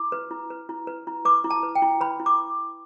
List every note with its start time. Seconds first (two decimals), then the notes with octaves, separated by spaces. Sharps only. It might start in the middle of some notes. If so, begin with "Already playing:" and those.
Already playing: E4 D6
0.12 B4
0.31 E4
0.50 B4
0.69 E4
0.87 B4
1.07 E4
1.25 B4 D6
1.44 E4
1.51 A5
1.63 B4
1.75 G5
1.82 E4
2.01 B4 B5
2.19 E4
2.26 D6